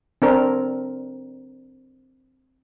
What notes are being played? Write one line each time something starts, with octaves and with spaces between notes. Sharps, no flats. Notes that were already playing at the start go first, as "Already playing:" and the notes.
C4 D4 A#4